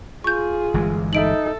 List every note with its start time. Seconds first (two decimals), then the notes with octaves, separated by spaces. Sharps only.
0.24 F4 G#4 C#6 G6
0.74 G1 E3 G#3
1.13 D#4 A4 E5 D7 F#7